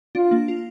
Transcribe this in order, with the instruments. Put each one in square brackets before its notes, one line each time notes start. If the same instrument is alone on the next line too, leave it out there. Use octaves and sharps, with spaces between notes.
[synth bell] D4 [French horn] F4
[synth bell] A#3
F4